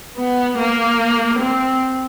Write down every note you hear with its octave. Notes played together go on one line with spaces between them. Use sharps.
B3
A#3
C4